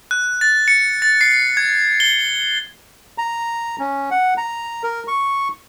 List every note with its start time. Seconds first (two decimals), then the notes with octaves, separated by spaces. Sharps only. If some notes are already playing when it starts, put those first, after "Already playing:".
0.11 F#6
0.41 A6
0.68 C#7
1.02 A6
1.21 C7
1.57 G#6
2.00 G7
3.18 A#5
3.79 C#4
4.11 F#5
4.38 A#5
4.83 A#4
5.08 C#6